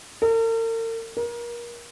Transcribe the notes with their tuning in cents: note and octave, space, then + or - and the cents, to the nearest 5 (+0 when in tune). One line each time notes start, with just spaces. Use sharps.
A#4 -45
A#4 +30